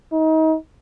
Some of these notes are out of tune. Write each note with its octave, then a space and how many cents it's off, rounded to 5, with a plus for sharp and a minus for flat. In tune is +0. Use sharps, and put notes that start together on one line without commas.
D#4 +30